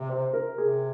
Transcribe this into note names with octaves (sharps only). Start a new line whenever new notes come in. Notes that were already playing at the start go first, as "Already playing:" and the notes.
Already playing: C3
C5
A#4
C3 G#4